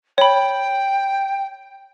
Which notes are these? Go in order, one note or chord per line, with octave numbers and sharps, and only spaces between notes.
C#5 G5 B5